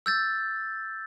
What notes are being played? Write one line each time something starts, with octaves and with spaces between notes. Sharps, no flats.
E6 G6 A6